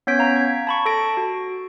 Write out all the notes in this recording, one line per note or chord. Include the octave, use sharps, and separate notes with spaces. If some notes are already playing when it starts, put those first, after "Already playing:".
B3 C#4 C#5 G6 B6 D7
F5 A#5
G#6
A5 B5 C#6
A4 A5 A#6 D7
F#4